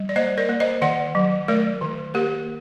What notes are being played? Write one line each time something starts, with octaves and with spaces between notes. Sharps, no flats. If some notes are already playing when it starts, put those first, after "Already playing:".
Already playing: G3
D5
A#3 C5 D#5
A#4 D5
A#3
C5 D#5
D#3 D5 F#5
F#3
A3 A#4 D5
D#3
A#3 G4 A#4